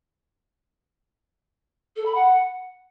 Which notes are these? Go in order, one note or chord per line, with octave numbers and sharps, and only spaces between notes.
A4
B5
F#5